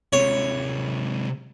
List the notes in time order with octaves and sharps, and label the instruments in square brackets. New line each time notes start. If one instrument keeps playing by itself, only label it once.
[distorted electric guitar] C3 G#3 [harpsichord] C#5